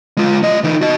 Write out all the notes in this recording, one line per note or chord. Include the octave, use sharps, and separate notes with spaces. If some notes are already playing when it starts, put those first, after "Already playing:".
G#3 F4
A3 D#5
E3 D#4
F#4 D#5